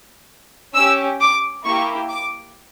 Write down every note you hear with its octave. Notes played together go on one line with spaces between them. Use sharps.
C#4 G4 E6
D6
A#3 E4 G4 C#6
D6